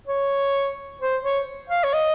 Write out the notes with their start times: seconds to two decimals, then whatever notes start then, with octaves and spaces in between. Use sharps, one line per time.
0.07 C#5
1.00 C5
1.23 C#5
1.70 F5
1.84 C#5
1.93 D#5